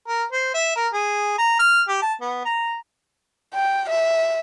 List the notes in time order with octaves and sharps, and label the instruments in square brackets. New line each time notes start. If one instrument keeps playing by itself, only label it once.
[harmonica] A#4
C5
E5
A#4
G#4
A#5
F6
G4
A5
B3
A#5
[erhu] G5
E5